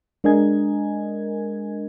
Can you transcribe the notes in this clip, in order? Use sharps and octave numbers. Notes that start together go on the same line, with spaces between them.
G#3 D4 A#4 D#5 G#5 G#6